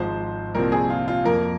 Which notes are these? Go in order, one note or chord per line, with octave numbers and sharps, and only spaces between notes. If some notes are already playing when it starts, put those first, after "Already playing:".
Already playing: G#1 G#2 F3 C5
C2 A#2 F3 C4 A#4
G#4
F4
F4
F2 F3 A#3 A#4